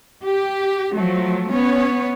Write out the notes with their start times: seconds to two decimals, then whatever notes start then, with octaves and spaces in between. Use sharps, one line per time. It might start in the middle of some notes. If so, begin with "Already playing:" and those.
0.23 G4
0.94 F3 F#3 A3
1.49 B3 C#4 C#5